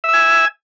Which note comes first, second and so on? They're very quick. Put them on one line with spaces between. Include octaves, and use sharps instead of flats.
E5 E6 G#5